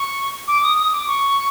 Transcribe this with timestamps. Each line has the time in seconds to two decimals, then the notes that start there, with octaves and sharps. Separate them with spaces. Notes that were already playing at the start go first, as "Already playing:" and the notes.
Already playing: C#6
0.48 D6
0.63 D#6
0.77 D#6
0.92 D6
1.07 C#6